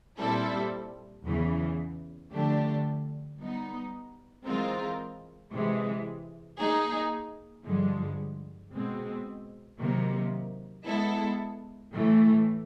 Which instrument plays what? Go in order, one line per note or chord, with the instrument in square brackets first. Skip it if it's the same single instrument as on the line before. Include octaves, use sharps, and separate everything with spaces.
[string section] A#2 G3 C4 E4 A4
E2 C#3 E3
D3 F3 A3 D4 G4
G3 B3 D#4
E3 G#3 C4 F4 A#4
C3 E3 G#3
A#3 D#4 G#4
G2 D3 F3 G#3
B2 G#3 C4
C3 D#3 F#3 A#3
G#3 B3 E4 A4
A2 E3 A3